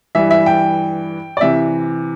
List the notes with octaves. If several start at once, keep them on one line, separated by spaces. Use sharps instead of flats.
G2 E3 E5
E5
G5
D5
C3 E3 E5